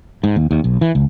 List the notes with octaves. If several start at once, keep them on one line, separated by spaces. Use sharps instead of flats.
G#2
D#2
D#2
B1
E3
C#2